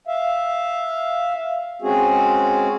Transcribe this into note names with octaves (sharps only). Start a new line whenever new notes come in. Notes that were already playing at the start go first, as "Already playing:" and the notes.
E5 F5
G#3 C4 C#4 F#4 G#4